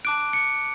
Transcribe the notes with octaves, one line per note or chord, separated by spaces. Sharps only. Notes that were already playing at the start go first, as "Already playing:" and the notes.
A5 D6 F#6 D7
C#7